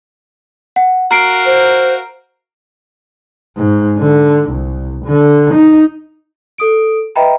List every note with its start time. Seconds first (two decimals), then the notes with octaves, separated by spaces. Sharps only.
0.76 F#5
1.11 F#4 A#4 F5 A#5 C7 D7
1.45 C5
3.57 G#2
3.98 D3
4.50 C2
5.05 D3
5.54 D#4
6.58 A4 D#6 D7
7.16 B4 D#5 E5 G5 A#5 B5